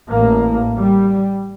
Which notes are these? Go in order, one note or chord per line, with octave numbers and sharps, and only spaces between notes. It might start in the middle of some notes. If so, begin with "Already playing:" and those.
A1 A2 A#3
G3